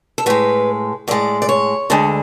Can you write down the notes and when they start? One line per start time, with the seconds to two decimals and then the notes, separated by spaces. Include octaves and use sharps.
0.18 A4
0.26 A2 G#3 B4
1.08 A2 G#3 D5
1.42 D5
1.49 C#5
1.90 D2 D3 G#3 A4